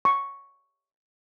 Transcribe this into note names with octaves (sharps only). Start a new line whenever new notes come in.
C#6